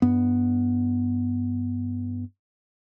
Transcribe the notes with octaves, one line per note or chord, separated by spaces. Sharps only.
G2 B3